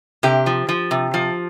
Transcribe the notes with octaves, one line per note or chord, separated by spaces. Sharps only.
C3 G4
F3
F3
C3
F3